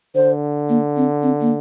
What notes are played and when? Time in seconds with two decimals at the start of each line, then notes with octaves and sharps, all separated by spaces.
0.15 D3 C5
0.69 A#3
0.97 C4
1.23 C4
1.41 A#3